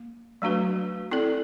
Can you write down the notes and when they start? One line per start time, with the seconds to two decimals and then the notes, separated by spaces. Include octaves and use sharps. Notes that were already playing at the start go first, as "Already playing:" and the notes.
Already playing: A#3
0.42 F#3 A3 D4 F#4 B4
1.11 C4 E4 A4 D5